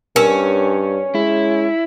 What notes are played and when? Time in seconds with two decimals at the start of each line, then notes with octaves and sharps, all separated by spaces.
0.16 G2 C#4 A#4
1.15 G#3 E4